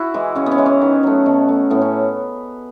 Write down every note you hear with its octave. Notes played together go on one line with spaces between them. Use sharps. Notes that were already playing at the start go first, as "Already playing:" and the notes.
Already playing: E4 F#4
E3 G#3
C#3 C#4
B3
C#4
E3 G#3
C#4
D#3
F#3 A3
B2
A3
A2 B3
C#4